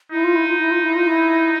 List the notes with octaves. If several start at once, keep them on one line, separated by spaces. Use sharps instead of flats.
D#4 E4
F4
E4
F4
E4
F4
E4
F4
E4